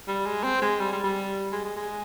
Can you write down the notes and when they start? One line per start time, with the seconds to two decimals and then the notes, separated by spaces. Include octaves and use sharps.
0.08 G3
0.26 G#3
0.44 C4
0.62 G#3
0.80 G3
0.92 G3
1.03 G3
1.52 G#3
1.64 G#3
1.76 G#3